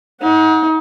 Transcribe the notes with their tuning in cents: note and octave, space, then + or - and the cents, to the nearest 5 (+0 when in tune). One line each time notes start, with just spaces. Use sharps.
D#4 +35 F#5 -5